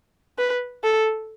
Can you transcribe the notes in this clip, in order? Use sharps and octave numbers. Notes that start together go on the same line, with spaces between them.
B4
A4